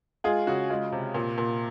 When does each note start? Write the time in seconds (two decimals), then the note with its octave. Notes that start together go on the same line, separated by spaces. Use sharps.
0.24 G#3 F4 G#4
0.47 C#3 F#4
0.70 G#3 F4
0.92 C3
1.15 A#2
1.38 A#2